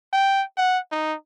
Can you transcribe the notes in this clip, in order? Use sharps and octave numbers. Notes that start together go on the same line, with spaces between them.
G5
F#5
D#4